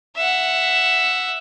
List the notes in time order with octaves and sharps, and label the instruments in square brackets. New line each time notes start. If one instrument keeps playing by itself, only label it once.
[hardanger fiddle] E5 F#5